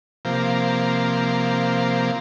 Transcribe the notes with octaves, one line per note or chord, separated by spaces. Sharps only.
C3 F3 A#3